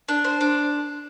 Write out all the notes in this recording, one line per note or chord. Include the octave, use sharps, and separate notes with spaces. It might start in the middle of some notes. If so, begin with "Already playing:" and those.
D4
C5
D4